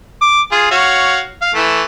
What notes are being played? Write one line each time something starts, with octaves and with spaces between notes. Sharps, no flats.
D6
F4 G#4
F#4 C#5 F5
F5
E3 A3